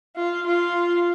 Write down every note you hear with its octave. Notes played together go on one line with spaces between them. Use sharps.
F4
F4